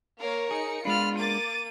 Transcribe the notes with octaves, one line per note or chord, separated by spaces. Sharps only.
A#3 A#4 C#5 F5
D#4 G#4 C#7
G#3 B3 D4 F4 B5 F6
A#3 D6 A6 D#7